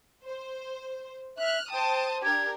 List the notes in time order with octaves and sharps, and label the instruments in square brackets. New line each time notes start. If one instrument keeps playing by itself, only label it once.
[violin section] C5
[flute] E5 [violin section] F6 F#6
[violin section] C5 A5 D#6 [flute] G5
[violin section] D4 G4 A#4 [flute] G#6